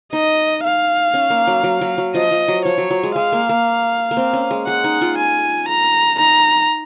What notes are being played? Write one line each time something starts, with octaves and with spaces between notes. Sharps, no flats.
D#4 D#5
F5
C#4
A#3
F#3
F#3
F#3
F#3
F3 D#5
F3
F#3
F3 C#5
F#3
F#3
G#3
G#3 F5
A#3
A#3
A#3
C4
C#4
G#3
G#3 F#5
D#4
F4
G#5
A#5
D#4 A#5